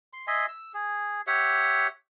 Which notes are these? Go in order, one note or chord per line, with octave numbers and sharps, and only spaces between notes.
C6
D#5 E5 G#5 C6
E6
G#4
G4 C#5 E5 F#5